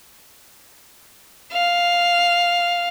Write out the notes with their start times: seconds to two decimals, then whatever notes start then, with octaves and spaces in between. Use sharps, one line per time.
1.53 F5